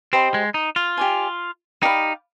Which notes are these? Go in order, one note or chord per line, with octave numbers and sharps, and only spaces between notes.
C4 G4 C5 D#5 B5
G#3
D#4
F4
G4 D5 G#5
D#4 G4 D5 F5 B5